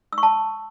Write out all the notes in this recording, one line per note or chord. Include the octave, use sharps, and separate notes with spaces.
E6
C#6
A5